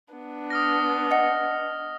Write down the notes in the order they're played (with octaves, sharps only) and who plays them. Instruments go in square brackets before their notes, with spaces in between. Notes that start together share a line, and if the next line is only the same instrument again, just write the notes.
[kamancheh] B3 D4
[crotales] D#6 F6 A#6
[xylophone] D#5 F#5